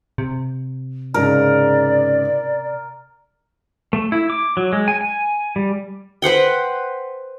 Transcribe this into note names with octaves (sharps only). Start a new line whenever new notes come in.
C3
G#2 C#3 A#4 D5
A3
E4
D6
F#3
G#3
G#5
G#5
G3
B4 C5 F#5 G5